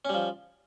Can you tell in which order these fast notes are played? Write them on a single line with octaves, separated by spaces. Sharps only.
C#4 G3 F3